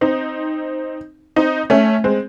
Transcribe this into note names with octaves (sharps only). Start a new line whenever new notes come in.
C4 D#4
C4 D#4
A3 C#4
G#3 C4